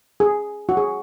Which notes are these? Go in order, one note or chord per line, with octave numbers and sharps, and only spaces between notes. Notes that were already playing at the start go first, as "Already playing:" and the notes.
G#4
F#4
G#4